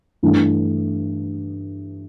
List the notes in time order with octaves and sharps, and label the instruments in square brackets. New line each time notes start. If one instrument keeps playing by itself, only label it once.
[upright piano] G2 E3 A3 D4